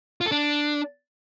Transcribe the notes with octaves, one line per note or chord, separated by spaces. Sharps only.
F4
A4
D4